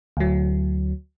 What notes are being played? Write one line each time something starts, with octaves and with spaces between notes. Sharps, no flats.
D2 F#3